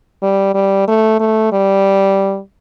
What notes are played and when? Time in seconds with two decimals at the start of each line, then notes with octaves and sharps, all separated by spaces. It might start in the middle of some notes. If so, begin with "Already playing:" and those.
0.23 G3
0.55 G3
0.88 A3
1.20 A3
1.52 G3